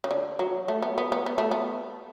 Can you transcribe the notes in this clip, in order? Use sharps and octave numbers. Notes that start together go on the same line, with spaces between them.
C#3
D3
F#3
A3
B3
B3
B3
B3
A3
B3